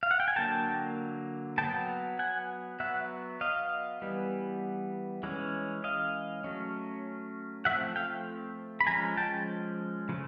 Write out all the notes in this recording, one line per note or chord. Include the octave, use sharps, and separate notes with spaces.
F5
F#5
G5
G#5
D3 F#3 A#3 G5 A5
F#3 B3 G5 A5
F#5 G#5
F#3 B3 E5 F#5
D#5 F5
E3 G3 B3
E3 G#3 C#4
D#5 F5
F#3 A3 C#4
F3 A3 C4 E5 F#5
F5 G5
B5
F3 G#3 C#4 G#5 A#5
G5 A5
C#3 F3 A3